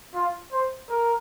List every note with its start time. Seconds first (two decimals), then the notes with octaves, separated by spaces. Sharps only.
0.14 F4
0.52 C5
0.90 A#4